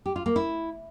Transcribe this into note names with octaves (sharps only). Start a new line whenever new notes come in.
G4
F4
A#3
E4